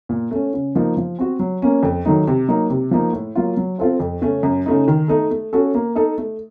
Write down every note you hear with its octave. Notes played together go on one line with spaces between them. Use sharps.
A#2
A3 C#4
C#3
F3 A#3 D#4
F3
C4 F#4
F#3
A#3 C#4
F2
D#3 F#3 A3 D#4
C3
F#3 A#3 D#4
C3
F3 A#3 D#4
A2
F#3 A#3 F4
F#3
C4 F4 A4 C5
F2
C#3 A3 C#4
F#2
C#3 A3 D#4
D#3
A3 D#4 A4
A3
C#4 F#4 A4
A#3
D#4 A4 D#5
A3